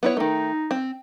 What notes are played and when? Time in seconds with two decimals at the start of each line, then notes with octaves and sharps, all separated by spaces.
0.03 B3 E4 C#5
0.17 D#3 A3 D#4
0.71 C4